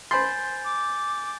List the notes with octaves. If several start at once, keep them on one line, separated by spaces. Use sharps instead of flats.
C5 G#5 B5 C6 G6 A6
D6